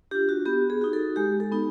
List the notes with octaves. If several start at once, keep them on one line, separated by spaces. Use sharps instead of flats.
D4 F4 G4
F#4
B3 G4
G#4
D#4 F#4
A4
G#3 G4
A4
B3 D#4